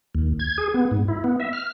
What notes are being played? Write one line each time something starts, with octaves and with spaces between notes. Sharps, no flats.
D#2
G#6
G#4
B3
G#2
E4
B3
E5
F6